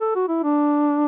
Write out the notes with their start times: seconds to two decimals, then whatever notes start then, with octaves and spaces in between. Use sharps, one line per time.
0.01 A4
0.15 F#4
0.29 E4
0.43 D4